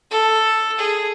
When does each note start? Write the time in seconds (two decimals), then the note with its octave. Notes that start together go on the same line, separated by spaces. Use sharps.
0.11 A4
0.79 G#4